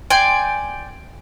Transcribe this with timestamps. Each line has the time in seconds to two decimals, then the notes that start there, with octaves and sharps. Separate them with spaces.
0.10 D5 G5 G#5 C6